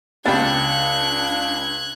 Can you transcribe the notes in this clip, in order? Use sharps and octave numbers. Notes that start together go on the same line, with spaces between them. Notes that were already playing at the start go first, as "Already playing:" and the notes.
C#2 B3 C#4 D4 G4 F#6 G#6 A6